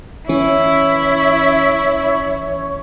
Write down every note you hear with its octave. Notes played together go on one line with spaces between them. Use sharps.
E3 C#4 E4 C#5